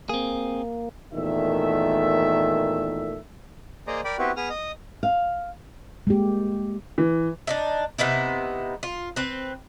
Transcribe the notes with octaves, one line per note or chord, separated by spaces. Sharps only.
A#3 C4 G#4
E2 A#2 D#3 A3 E5
A#3 G#4 C5 D5 D#5 A#5
A#4 D5 G5 B5 D6
B3 C4 E4 F#4 G4 B4
B3 G#4 D#6 F6
D#5 D#6
F5
G#3 A#3 G4
E3
D4 D#4 E5
C3 B3 D#4 E4
F4
C4 B4